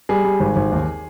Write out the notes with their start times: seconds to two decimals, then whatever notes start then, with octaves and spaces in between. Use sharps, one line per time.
0.09 G3 G#4
0.24 G3
0.40 G#1
0.56 G#1
0.72 D#2